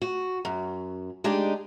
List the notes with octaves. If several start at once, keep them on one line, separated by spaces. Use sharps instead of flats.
F#4
F#2
G#3 D4 D#4 G4 G#4